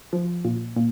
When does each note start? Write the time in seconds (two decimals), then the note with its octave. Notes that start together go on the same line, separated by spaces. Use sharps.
0.13 F3
0.44 A#2
0.76 A#2